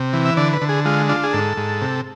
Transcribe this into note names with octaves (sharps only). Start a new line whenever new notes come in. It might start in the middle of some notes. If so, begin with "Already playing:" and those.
Already playing: C3
E3
E5
D3 D5
B4
D3
G#4
G#3 F4
D4 F4
G#4
G#2 A4
G#2
C3